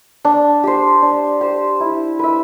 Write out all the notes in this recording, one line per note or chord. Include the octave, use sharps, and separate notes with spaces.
D4
G4 C5
D4
G4 C5
E4
B4 E5